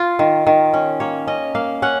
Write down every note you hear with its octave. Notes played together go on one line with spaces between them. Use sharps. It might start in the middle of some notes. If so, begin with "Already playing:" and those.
Already playing: F4
D#3
D#3
C#4
A#3 C#5
C#4 D#5
A#3 F5
C#4 F#5